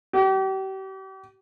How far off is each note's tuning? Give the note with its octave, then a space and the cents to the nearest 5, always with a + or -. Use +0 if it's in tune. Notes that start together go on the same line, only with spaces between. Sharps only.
G4 -40